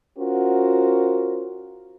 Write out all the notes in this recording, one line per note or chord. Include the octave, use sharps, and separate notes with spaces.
C#4 F4 F#4 A#4 C5